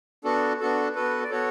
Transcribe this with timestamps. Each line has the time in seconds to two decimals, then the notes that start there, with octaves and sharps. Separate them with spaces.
0.24 B3 D4 F#4 A4
0.60 B3 D4 F#4 A4
0.95 B3 F#4 A4 B4
1.23 D5
1.30 B3 F#4 A4 C#5